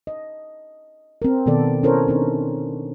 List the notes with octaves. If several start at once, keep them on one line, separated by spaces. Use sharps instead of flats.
D#5
C4 A#4
B2 D#3 B3 A4 D5
C#4 E4 A4 A#4 C5 C#5
C4 D4 D#4